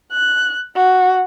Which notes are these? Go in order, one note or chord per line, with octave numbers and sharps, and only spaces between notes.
F#6
F#4